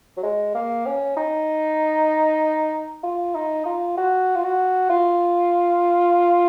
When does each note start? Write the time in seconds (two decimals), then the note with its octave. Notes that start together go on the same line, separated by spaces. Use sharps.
0.17 F#3
0.23 G#3
0.55 A#3
0.86 C#4
1.17 D#4
3.04 F4
3.35 D#4
3.65 F4
3.97 F#4
4.35 F4
4.44 F#4
4.90 F4